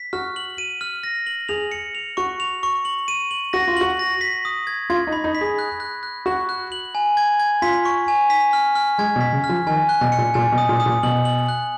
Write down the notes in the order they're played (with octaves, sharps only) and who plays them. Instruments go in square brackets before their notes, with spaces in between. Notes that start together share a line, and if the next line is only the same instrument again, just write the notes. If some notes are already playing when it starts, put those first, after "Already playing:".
Already playing: [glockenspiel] B6
[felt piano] F#4 [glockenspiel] F6
[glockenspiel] F#7
D#7
F6
A#6
F#7
[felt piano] G#4 [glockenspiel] F7
[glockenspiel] C#7
F7
[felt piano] F#4 [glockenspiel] C#6
[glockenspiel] F7
C#6
F#7
D#7
F#7
[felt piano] F#4 [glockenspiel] A#6
[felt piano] F4
[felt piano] F#4 [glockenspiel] F#7
[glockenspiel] A#6
B6
D#6
G#6
[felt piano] F4 [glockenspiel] G#6
[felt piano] D#4
[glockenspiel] B5
[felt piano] D#4
[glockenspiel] B6
[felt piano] G#4
[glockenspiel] F#6
F#6
F#6
[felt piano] F#4 [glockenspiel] F#6
[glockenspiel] F#6
F#7
G#5
G#6
G#6
[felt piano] F4 [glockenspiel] B6
[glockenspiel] C#6
G#5
B6
F6
F6
[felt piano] G#3 [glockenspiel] G#6
[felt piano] B2
[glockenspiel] B6
[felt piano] C#3
[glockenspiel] F6
[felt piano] F3
[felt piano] D#3 [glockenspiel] G#5
[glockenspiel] F#6
[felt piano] B2
[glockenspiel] C#7
[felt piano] A#2
[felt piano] A#2 [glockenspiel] G#5
[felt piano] B2
[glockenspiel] D#6
[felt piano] A#2
[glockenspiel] D#6
[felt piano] A#2
[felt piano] B2 [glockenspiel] F#7
[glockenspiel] F#7
F#6